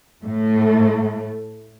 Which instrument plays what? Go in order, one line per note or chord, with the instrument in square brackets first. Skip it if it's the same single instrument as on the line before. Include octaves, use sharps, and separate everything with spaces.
[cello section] A2 A3